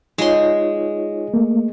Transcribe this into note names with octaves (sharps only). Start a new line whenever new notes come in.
G#3 D#4 F4 C#5 C6
A3 A#3